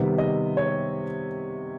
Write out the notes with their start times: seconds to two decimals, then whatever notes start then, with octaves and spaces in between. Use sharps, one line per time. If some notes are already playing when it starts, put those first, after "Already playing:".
Already playing: C3 D#3 G3 B3 E5
0.18 D#5
0.57 C#5